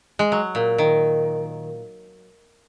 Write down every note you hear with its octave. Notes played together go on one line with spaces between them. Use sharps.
G#3
F#3
A#2
D#3